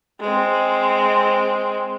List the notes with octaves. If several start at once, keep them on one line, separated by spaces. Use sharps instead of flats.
G#3 C4